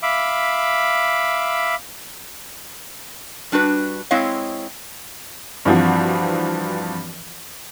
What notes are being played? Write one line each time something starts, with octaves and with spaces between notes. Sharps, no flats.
E5 F5 B5 D6
G3 D4 F#4 B4
G#3 C4 E4 C#5 D#5 F5
G2 E3 F3 C4 F#4